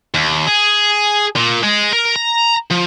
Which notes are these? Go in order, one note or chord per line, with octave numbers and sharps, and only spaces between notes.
D#2
G#4
A#2
G#3
A#4
A#5
F3